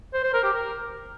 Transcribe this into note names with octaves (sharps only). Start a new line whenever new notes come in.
C5
C5
A#4
G4
A#4